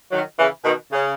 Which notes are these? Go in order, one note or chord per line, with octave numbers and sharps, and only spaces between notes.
D#3 F#3
C#3 E3
B2 D#3
C#3